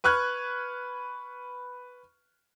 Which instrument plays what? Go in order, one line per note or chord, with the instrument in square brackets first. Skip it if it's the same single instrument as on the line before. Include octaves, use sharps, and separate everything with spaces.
[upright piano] B4 C#6 F6 F#6 G#6